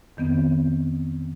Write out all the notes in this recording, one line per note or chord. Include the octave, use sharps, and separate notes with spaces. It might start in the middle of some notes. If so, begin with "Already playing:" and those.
F2 D#3 B3 C4